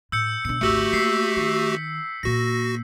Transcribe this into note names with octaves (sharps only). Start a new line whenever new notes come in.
A2 E6 G6 C#7
B2 D4 C#7
G#1 D2 A3 F#4 G4 E6 C#7
A#3 B6 C7
D#3
A#2 A#3 F#4 A#6